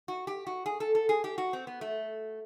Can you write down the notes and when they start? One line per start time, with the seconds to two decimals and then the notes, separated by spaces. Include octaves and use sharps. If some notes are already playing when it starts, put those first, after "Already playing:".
0.08 F#4
0.27 G4
0.47 F#4
0.66 G#4
0.80 A4
0.95 A4
1.09 G#4
1.24 G4
1.38 F#4
1.53 C4
1.67 B3
1.81 A3